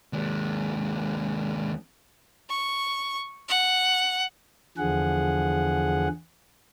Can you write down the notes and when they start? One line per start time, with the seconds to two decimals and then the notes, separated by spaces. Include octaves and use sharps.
0.13 D#2 G#3
2.50 C#6
3.49 F#5
4.78 E2 D3 F3 G#4 F#5